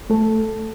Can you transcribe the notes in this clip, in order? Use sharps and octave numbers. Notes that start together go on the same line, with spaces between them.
A3 A4